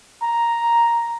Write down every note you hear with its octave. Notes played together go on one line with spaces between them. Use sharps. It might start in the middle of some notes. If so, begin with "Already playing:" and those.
A#5